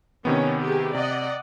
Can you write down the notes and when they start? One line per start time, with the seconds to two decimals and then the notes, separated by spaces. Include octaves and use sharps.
0.25 C3 D#3 B3 C#4
0.61 G4 G#4
0.94 C3 D5 D#5 F#5